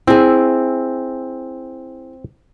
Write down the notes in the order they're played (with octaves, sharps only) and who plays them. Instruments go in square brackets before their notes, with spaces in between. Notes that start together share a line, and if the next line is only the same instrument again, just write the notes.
[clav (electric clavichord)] C4 [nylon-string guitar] E4 G#4